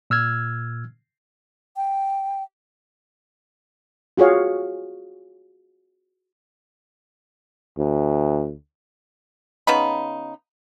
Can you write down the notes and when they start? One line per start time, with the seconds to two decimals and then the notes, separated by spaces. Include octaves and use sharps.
0.10 A#2 E6 F6 G#6
1.76 G5
4.17 F4 F#4 G#4 C#5 F5
7.78 D2
9.67 C#3 B3 D#4 B5